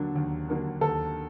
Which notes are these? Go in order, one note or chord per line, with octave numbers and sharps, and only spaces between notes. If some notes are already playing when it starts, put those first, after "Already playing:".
Already playing: D#2 D3 F#3 A#3 D4
D#2
D3 F#3 A#3 D4
D#2 A4